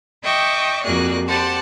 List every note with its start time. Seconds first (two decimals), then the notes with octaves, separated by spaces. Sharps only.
0.22 D#5 E5 G5 C#6 D6
0.83 F2 A#3 F#4 G#4 D5 F#6
1.27 G4 C5 D5 F#5 A5